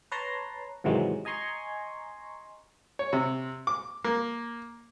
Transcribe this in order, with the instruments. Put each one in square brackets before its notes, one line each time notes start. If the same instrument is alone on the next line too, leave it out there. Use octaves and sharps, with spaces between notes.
[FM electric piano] B4 C#5 A5 A#5 C6
G#2 C3 D#3 E3 F#3 G#3
D#5 G#5 A#5 C6 C#6
[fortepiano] C#5
C3
D6
A#3